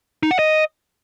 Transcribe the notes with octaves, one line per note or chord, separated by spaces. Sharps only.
D#4
F#5
D#5